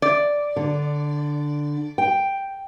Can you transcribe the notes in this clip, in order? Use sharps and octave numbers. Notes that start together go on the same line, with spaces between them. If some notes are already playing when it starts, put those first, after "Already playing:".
D5
D3
G5